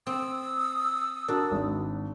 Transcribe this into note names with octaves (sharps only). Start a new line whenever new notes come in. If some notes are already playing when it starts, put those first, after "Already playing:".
C4 D#6 E6
D4 F#4 A#4
G#1